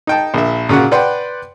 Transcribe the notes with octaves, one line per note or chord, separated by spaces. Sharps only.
D#4 G5 A5
A#1 E5
A#2 C#3 F#4 F#5
B4 D5 F#5 G5 C6